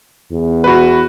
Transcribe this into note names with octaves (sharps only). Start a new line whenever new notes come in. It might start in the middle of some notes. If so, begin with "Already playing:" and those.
E2
F#4 B4